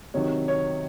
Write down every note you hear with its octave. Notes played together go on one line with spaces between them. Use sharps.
C3 D#3 F#3 C#5
C#5